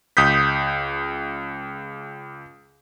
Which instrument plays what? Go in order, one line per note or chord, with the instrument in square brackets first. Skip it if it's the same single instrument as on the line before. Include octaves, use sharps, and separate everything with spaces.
[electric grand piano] C#2 D#6 G6 B6